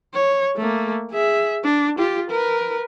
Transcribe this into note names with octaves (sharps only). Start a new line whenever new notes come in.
C#5
A3 A#3
G#4 E5
D4
F4 G4
A#4 B4